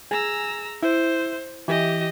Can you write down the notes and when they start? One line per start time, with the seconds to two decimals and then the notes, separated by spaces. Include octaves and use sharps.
0.11 G#4 A#5 E6
0.83 E4 C5
1.68 E3 G4 D#5